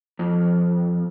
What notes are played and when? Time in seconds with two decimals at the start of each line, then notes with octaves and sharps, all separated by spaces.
0.19 F2